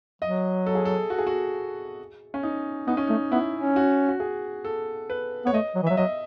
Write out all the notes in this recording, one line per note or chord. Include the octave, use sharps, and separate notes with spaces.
F#3 D#5
A4
G#4
A4
F#4
G#4
F#4
C#4
D#4
B3 D#4
C#4
A3 D#4
B3 E4
C#4
F#4
F#4
G#4
A4
B4
B3 C#5
A3 D#5
F#3
E3
F#3 E5
F#3 D#5